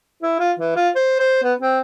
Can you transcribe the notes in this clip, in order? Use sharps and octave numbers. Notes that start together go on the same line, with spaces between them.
E4
F4
E3
F4
C5
C5
B3
C4